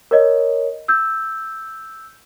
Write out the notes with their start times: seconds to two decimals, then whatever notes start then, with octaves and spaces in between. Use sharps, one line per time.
0.11 A#4 C#5 D#5
0.88 E6 G6